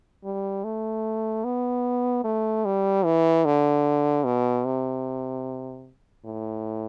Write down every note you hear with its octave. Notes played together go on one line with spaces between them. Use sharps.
G3
A3
B3
A3
G3
E3
D3
B2
C3
A2